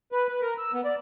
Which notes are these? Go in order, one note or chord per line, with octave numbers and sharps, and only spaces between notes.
B4
B4
A#4
E6
B3
D5